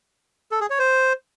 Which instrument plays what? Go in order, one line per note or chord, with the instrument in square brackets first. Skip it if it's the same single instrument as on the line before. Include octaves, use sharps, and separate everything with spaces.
[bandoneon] A4
G#4
C#5
C5